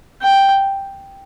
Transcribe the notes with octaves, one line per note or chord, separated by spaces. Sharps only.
G5